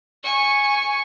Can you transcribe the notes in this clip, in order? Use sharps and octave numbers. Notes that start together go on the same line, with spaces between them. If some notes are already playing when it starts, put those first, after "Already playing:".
G#5 C#6